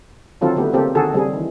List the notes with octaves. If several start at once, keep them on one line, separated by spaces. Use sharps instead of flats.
D3 D#3 F#3 C4 F4 A4
D3 A3 B3 G4
C#3 A#3 C4 G4 A4
D3 D#3 F#4 G#4 A4
C#3 G3 C4 G#4
D#3 E3